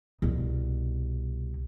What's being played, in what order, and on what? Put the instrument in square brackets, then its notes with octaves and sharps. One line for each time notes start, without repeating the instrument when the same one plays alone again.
[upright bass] C2 B2